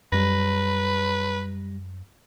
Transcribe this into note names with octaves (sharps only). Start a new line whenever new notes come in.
F#2 G3 B4 A#6